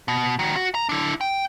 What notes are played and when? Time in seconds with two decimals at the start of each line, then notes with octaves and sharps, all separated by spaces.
0.08 B2
0.39 D#3 F#4
0.56 F#4
0.75 A#5
0.89 D4 E4
1.21 G5